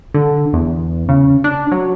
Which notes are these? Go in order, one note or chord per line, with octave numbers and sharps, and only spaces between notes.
D3
E2
C#3
D4
F#3